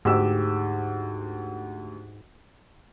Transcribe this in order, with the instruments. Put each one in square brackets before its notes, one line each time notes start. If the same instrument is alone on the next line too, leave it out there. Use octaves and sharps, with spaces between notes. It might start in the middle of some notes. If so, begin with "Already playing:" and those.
[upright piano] D2 G4 E6 [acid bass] G#2